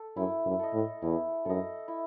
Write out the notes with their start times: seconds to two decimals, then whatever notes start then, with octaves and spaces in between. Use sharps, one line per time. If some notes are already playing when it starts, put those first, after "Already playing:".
Already playing: A4
0.16 F#2 E4
0.46 F#2
0.59 A4 D#5
0.73 A2
1.02 E2 E4
1.45 F#2 A4 D#5
1.88 E4